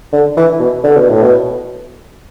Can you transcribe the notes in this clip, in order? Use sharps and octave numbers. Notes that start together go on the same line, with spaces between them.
D3
E3
B2
D3
B2
A2
B2